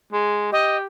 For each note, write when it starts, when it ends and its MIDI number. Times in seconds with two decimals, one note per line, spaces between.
0.13 0.50 56
0.52 0.86 67
0.52 0.77 75